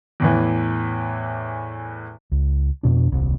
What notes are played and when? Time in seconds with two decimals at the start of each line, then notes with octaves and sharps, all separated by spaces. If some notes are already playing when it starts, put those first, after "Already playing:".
0.20 E2 A2 E3
2.32 C#2
2.83 F2 B2 D4
3.12 D#1 C2